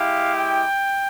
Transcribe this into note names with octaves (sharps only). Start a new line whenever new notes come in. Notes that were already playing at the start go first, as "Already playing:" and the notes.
Already playing: G#3 E4 G4 F5
G5